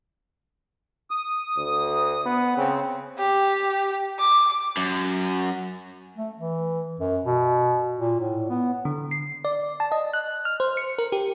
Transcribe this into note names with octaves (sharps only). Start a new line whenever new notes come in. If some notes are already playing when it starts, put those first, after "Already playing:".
D#6
D2
B3
C#3 C4
G4
D6
F#2
A3
E3
F#2
B2
A#2
A2
B3
D3
C7
D5
A5
D#5
F#6
F6
C5
C#7
A#4
G4